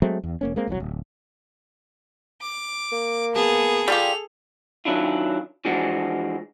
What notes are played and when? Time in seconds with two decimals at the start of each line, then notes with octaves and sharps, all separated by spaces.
0.02 F#3 G#3 A3 C4
0.24 E2
0.41 E1 A#3 C#4
0.56 G#3 A#3 C4
0.67 E1 C2 C3 F#3
0.80 D1
2.42 D6
2.93 A#3
3.36 B3 G#4 A5
3.88 G3 F4 G4 A4 F7
4.85 D#3 F#3 C#4 D4 E4 F4
5.65 E3 F3 G#3 D4 F#4